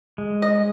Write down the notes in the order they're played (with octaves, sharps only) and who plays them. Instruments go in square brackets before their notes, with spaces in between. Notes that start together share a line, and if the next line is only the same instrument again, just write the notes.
[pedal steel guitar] G#3
[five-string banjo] D#5